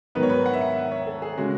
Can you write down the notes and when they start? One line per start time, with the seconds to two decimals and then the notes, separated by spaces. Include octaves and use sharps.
0.15 G#2 D#3 F#3 B3 D#4 B4
0.23 C#5
0.30 B4
0.46 F#5
0.53 E5
0.61 F#5
0.77 E5
0.91 C#5
1.07 A4
1.22 G#4
1.38 C#3 G#3 C#4 F#4